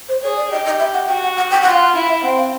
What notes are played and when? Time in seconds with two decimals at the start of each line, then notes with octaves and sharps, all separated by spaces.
0.09 C5
0.22 G#4 C#5
0.37 D5
0.51 G4 D#5
0.66 D#5
0.79 E5
0.94 F#5
1.08 F#4 G5
1.22 F#5
1.36 F#5
1.51 G5
1.62 F4 F#5
1.71 F5
1.81 F#5
1.94 E4 F5
2.09 E5
2.23 C4 F#5
2.38 F5